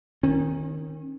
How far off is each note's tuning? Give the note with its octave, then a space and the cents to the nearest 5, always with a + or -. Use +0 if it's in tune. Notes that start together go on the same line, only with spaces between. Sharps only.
D#3 +0 C#4 -40